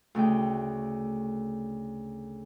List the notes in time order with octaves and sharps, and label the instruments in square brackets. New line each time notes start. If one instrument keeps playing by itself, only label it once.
[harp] D2 C#3 A3 G5